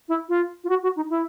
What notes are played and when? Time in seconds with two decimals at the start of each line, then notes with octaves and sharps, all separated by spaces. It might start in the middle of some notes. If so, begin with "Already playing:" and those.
0.08 E4
0.29 F4
0.64 F4
0.69 F#4
0.83 F#4
0.96 D#4
1.10 E4